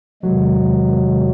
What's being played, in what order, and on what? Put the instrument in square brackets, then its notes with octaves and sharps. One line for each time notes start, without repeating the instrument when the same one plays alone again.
[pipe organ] E2 C3 D#3 G#3 [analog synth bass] F#3